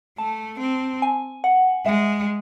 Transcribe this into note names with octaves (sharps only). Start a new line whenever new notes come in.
A3 A5
C4
G#5
F#5
G#3 E5